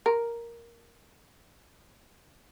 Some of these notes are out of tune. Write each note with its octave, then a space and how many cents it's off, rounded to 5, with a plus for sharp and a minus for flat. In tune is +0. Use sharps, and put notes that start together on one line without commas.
A#4 +5